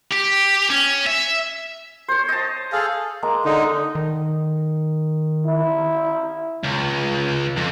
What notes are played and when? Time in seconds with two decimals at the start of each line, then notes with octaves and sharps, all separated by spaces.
0.13 G4
0.70 C#4
1.07 E5
2.08 C5 C#5
2.28 D#5 A5
2.73 G#4 A4 F5
3.22 G#3 A#3 A#5
3.45 D3 D#4
3.95 D#3
5.46 E4
6.64 C#2
7.56 F2